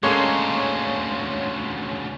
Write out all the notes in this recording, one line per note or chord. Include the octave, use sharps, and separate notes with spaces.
D2 C#3 G#3 A#3 C#4 A4 C#5 C6